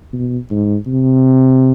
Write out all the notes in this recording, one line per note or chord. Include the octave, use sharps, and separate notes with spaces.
B2
G#2
C3